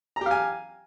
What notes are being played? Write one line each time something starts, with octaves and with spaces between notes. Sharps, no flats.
G4 F5 G#5 A#5